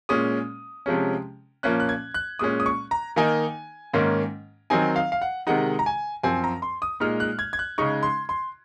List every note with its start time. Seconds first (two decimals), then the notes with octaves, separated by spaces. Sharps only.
0.09 A#2 G#3 C#4 D#6
0.86 C3 F3 G#3 C#4
1.63 A#2 F3 A#3 C#4 F#6
1.80 F#6
1.89 G#6
2.14 F#6
2.39 A#2 G#3 C#4 D#6
2.60 D#6
2.66 C#6
2.91 A#5
3.16 D#3 A#3 D#4 G#5
3.94 G#2 D#3 A#3 C#4
4.70 D#3 F#3 C4 D#4 G#5
4.96 F5
5.12 F5
5.22 F#5
5.47 C3 D#3 G#3 D#4 F#5
5.79 A#5
5.86 G#5
6.23 F#2 F3 C4 G#5
6.44 A#5
6.62 C6
6.82 D#6
7.00 A#2 G#3 D#4 F6
7.20 F#6
7.39 G#6
7.53 G#6
7.59 F#6
7.78 C#3 G#3 D#4 C#6
8.03 C6
8.29 C6